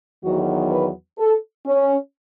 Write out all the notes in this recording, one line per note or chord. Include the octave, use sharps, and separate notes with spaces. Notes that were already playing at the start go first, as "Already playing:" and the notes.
E2 D#3 F#3 B3 F#4
B4
A4
C#4